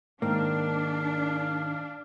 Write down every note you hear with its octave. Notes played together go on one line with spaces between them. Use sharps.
G#2 D#3 A#3 D4 F5